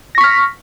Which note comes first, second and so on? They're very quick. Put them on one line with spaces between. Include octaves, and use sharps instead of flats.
A#6 C#6 B6 F6